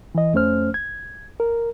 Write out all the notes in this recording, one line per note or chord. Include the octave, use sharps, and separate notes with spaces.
E3 D#5
F2 A3 C#4 C5 F6
G#6
A#4